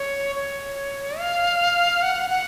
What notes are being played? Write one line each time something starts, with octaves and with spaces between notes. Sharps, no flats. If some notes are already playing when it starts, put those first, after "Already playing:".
Already playing: C#5
C#5
F5
F#5
F#5